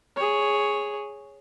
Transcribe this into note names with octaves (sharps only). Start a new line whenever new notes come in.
G#4 C#5